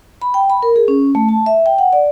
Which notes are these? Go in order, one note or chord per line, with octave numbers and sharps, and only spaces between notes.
B5
G5
B5
A#4
G#4
C#4
A3
A5
E5
G5
F#5
D5